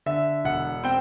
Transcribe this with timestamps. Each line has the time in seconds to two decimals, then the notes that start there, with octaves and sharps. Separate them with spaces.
0.06 D3 E5
0.45 E1 F#5
0.84 C4 G5